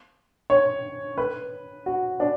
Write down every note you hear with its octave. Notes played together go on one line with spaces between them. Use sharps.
C#5
B4
F#4
D4